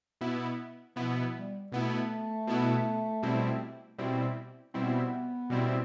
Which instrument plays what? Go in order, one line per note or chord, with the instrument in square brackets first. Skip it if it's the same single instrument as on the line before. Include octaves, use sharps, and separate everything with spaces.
[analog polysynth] B2 B3 E4
[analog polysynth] B2 B3 E4 [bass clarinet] F3
[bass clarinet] G3
[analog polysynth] B2 B3 E4 [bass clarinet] A3
[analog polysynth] B2 B3 E4
B2 G3 C4 E4
B2 G3 C4 E4
[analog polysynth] B2 G3 C4 E4 [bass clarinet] B3
[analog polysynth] B2 G3 C4 E4